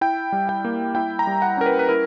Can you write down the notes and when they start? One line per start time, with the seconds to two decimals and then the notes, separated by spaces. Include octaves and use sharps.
0.01 E4 G5
0.32 G3
0.49 G5
0.65 A#3
0.95 E4 G5
1.19 A#5
1.27 G3
1.42 F#5
1.57 C#4 A#4
1.66 B4
1.79 B4
1.89 E4 A#4